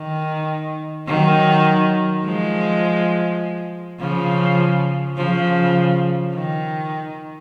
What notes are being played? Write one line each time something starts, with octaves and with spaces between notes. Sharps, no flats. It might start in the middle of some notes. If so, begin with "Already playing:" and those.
Already playing: D#3
D#3 F#3
F3 G#3
C#3 F3
C#3 F3
D#3